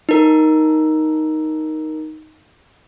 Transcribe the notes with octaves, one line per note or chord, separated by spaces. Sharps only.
D#4 A#4